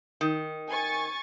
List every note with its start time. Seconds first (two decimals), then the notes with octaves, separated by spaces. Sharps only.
0.21 D#3
0.69 G#5 C#6 A6